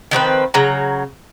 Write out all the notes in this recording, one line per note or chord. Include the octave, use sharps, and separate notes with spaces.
D#3 F3 C4 B4
C#3 F#3 A#5